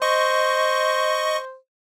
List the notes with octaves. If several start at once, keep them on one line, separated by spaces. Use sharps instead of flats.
C5 D#5 C#6